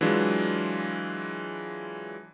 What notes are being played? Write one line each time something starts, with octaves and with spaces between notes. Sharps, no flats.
E3 F#3 G#3 D4 F4